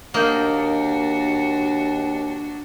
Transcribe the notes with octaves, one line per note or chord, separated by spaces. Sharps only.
D#2 A#3 D4 F#4 D#5 G5